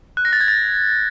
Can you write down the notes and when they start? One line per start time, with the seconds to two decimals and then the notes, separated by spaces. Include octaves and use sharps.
0.17 F#6
0.25 A#6
0.33 A6
0.40 G#6
0.48 A6